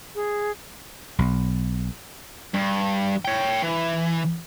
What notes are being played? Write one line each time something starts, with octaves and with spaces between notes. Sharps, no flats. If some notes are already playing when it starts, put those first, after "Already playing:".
G#4
B1
G2
C#5 G5
E3